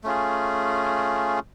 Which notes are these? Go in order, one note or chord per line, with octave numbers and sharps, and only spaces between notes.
A3 C#4 F4 G#4